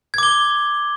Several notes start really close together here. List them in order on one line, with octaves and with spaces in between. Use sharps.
G#6 D6 G7